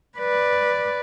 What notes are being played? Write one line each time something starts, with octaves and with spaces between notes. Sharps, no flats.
B4 D5